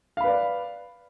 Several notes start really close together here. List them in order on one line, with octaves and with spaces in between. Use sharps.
F5 B5 B4 D5